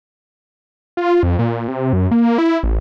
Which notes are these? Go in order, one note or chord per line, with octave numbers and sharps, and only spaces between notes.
F4
F2
A#2
C3
F#2
A#3
E4
A1